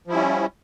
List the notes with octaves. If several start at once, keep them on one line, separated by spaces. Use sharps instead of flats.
F3 G3 C#4 E4